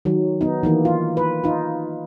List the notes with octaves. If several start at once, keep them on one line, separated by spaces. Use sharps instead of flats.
D#3 F#3
B3 D#4
D#3 E3 A#3
F4
B4
D#4 F4